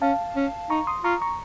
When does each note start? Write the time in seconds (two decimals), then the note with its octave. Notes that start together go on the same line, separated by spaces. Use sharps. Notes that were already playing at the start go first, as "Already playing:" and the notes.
0.02 C#4 F5 A5
0.36 C#4
0.70 D#4 A#5 C#6
0.87 C6 D#6
1.04 F4 A#5 C#6
1.22 A#5 C#6